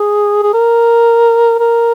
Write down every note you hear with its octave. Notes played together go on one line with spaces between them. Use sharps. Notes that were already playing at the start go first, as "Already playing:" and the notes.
Already playing: G#4
G#4
A#4
A#4